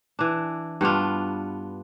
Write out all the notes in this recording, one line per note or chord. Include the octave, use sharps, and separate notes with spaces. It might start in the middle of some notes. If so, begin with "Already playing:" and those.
E3 D4
G2 B3 D4 F4